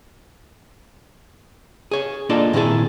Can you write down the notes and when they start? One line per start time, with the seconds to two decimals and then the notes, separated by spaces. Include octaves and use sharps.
1.91 G#4 C#5
2.29 A#3 D4 D#4 F4 A4 D5
2.53 A#2 D#3 C4 E4 G#4 A4